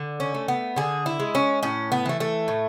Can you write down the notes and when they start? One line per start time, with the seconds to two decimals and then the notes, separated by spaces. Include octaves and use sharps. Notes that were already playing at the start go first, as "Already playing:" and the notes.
Already playing: D3
0.20 C#4
0.35 A3
0.48 B3
0.76 D3 G#4
1.06 E4
1.20 G#3
1.35 C#4
1.63 A2 C#4
1.92 B3
2.06 E3 A3
2.20 A3
2.48 A2